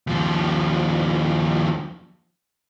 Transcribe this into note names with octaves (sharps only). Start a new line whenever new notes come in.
D#2 F3